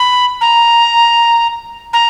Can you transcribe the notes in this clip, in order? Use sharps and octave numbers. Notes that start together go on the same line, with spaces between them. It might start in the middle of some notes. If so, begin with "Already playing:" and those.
Already playing: B5
A#5
A#5